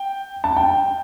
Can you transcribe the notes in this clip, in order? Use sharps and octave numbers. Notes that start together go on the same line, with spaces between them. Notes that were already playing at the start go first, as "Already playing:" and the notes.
Already playing: G5
A5
G5